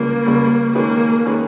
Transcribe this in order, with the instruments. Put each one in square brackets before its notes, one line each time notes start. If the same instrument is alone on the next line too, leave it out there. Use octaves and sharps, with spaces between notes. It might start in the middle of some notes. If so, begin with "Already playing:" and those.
Already playing: [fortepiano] C#2 C#3 G3 [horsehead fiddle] A#3
[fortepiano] C#2 C#3 G3
[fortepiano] D#3 G#3 C#4 G#4 B4 [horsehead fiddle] A#3
[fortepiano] D#3 G#3 C#4 G#4 B4